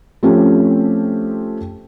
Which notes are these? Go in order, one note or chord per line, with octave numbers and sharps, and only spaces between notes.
F3 A3 C4 C#4 G4